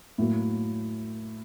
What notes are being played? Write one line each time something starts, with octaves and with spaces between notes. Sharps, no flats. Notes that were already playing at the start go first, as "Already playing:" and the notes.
A2 F#3 A#3